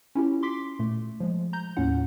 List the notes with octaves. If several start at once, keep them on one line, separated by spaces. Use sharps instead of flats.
C#4 E4 F4 G4
C6 D6 B6
A#2 A3
F3 G#3
A#5 G6
D#2 A2 C#4 F4 F#5